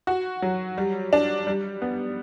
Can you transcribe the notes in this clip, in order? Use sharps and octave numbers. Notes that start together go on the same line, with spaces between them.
F#4
F#3
G3
D4
G3
B3